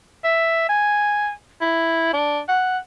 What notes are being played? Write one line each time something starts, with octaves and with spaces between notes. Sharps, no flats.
E5
G#5
E4
D4
F#5